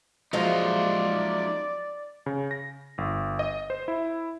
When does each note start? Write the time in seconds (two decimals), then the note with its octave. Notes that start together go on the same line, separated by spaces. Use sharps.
0.33 F3 F#3 G#3 D#4 F4 D5
2.26 C#3
2.51 A#6
2.98 G1
3.39 D#5
3.70 C5
3.88 E4